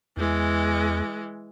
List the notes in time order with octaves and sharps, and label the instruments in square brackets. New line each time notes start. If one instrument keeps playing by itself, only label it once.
[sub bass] E2 [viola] E3 G#3